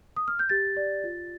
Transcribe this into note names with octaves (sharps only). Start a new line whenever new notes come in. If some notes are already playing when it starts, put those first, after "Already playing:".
D#6
F6
G6
G4 A6
D5
F4